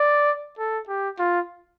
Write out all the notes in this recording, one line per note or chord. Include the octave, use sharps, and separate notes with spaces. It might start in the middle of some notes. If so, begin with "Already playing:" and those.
Already playing: D5
A4
G4
F4